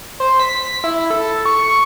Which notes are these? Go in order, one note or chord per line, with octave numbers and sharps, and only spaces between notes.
C5
B6
E4
A4
C#6